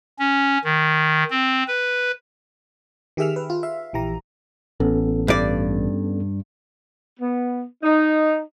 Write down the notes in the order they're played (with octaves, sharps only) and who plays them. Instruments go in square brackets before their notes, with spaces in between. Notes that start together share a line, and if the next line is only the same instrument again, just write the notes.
[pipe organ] C#4
D#3
C4
B4
[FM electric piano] D#3 G4 G#4 E5 E6 F6
B4
F4
E5 F5
A#1 E3 G4 A#5
[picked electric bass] A1 [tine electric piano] B3 C#4 A4
[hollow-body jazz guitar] G2 D5
[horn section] B3
D#4